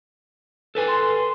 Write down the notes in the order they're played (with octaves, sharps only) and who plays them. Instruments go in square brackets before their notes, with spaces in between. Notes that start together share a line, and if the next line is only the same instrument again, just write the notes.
[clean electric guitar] A4 B4 G#5
[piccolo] C6